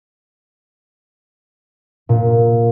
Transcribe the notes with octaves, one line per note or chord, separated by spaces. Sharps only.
A#2